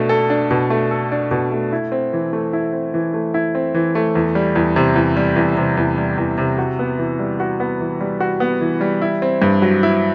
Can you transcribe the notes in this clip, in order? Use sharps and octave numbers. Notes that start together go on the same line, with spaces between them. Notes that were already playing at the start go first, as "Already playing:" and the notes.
Already playing: B2 A3 D4
A4
D4
B2
A3
A4
D4
B2
A3
E4
C4
E3
A3
E4
C4
E3
A3
E4
C4
E3
A3
E2
G3
E2
C3
E2
G3
E2
C3
E2
G3
E2
C3
F#4
B3
E3
G3
F#4
B3
E3
G3
F#4
B3
E3
G3
E4
C4
G2
F#3
E4